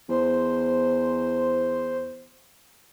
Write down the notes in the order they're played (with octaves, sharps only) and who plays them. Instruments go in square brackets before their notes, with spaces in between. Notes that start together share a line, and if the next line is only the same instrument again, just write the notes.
[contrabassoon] E2 [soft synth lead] C5